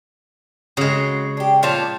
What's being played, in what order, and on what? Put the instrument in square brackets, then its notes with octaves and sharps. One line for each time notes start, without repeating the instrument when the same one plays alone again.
[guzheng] C#3 G#3 [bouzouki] F#3
[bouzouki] D4 G4
[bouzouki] A#2 F3 C#5 [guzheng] C5 F5 A5